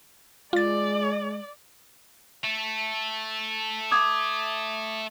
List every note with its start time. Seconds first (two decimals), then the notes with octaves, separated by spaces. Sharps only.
0.53 G#3 F4 D5 A6
2.44 A3
3.91 D6 D#6 G#6